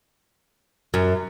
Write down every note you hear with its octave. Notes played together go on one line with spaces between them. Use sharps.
F#2